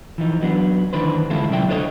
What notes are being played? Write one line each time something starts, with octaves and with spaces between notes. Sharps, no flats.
E3 F3 D#4
F#3 B3 D4
D2 D#3 E3 D4 B4 C5
D3 G#3 C#4 E4 F4 A4
C3 F#3 E4 D5 E5 G5
D4 F4 A4 C5 C#5 D#5